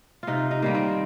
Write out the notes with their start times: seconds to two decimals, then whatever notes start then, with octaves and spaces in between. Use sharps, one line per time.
0.23 C3 D#4 F4
0.51 D#4
0.62 D#3 G3 A#3
0.75 C4